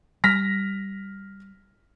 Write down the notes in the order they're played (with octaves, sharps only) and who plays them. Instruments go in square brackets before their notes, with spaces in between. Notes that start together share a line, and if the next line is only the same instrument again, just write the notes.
[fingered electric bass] G3 [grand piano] F6 A#6 B6